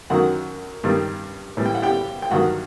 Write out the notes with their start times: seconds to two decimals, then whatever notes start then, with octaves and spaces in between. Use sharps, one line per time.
0.10 F#2 D#3 F#3 F#4 F#5
0.84 G2 D#3 G3
1.57 A2 E3 G3
1.66 G5
1.75 F#5
1.83 G4 G5
2.22 G5
2.31 G2 D#3 F#3 F#4 F#5